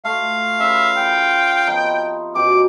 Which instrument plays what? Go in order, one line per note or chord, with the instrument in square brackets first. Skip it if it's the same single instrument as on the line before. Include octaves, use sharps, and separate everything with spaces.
[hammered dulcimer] A3 F4 [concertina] F5
[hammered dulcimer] C#3 F4 B4 [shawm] E5
[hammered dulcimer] F4 G#4 [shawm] G5
[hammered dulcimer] F3 B3 D#4
C3
[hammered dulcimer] F#2 B2 G4 [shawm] D6